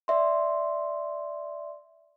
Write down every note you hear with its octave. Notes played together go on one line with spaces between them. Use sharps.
D5 E5 C6